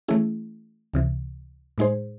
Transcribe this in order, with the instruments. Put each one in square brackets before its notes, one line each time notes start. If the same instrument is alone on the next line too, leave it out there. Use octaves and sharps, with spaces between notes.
[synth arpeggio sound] E3 A3 C#4 E4 G#4
C#2 C3 E3
A2 G#3 D#4 G#4 C5